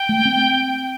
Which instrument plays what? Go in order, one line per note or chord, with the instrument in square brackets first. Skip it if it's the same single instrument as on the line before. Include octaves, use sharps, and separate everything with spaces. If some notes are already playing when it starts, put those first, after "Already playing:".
Already playing: [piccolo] G5
[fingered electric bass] A3
C4